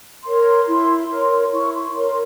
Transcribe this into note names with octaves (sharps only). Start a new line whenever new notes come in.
A#4 C#5 C6
E4
A#4 C#5
E4 C#6
C6
A#4 C#5 C6